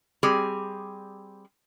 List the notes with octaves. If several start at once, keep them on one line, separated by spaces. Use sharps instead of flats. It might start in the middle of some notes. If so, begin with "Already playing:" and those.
G3 C4 G4 G#4